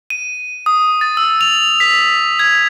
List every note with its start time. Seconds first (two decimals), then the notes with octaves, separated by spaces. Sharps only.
0.10 D#7
0.66 D#6
1.01 A6
1.17 E6
1.41 F7
1.80 B6
2.39 G#6